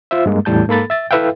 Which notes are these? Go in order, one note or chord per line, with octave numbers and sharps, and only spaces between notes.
F4 C5 E5
G2 G#3 A#3
E2 A2 G3 A5 G6
G#2 A#3 A4 B5 A6
E5 A6
E4 A4 B4 E5 F5 G5